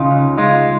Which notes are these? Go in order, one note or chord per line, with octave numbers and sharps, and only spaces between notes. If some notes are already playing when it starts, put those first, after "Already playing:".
Already playing: C#3 D#4 F4
C#2
G#3 D#4 F4